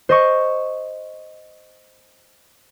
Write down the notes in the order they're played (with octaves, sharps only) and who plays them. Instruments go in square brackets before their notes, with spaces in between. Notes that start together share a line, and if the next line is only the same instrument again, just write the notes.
[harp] C5 D#5 C#6